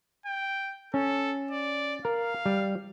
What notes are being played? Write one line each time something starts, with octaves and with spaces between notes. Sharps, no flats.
G5
C#4 A4
D5
A#4 F5
G3